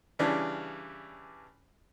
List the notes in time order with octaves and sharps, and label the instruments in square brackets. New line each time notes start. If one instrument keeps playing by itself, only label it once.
[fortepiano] C#3 E3 G3 C#4 D4